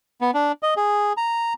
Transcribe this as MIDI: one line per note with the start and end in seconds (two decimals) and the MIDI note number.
0.21 0.31 59
0.34 0.52 62
0.63 0.74 75
0.77 1.13 68
1.17 1.53 82